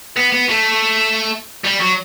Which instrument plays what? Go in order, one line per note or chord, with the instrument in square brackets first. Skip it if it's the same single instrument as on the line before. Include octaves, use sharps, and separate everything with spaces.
[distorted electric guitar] B3
B3
A3
G3
F#3